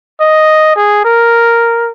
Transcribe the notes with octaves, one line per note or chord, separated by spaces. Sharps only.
D#5
G#4
A#4